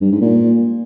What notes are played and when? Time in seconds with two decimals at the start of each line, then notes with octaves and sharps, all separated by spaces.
0.01 G2
0.11 G#2
0.21 A#2